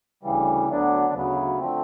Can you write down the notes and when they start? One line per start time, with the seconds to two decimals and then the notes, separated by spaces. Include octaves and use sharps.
0.23 D2 C#3 E3 G3
0.69 D2 D3 F#3 B3 D4
1.13 D2 C#3 F#3 B3
1.59 D3 F3 A3 C4